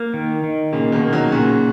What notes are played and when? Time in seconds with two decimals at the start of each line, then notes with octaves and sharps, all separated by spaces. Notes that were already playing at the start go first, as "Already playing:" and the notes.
Already playing: A#3
0.14 D#3
0.44 D#3
0.73 A#2 C#3 A#3
0.92 B2 D#3
1.03 A#3
1.12 D#3 F#3
1.32 A#2 C#3 F#4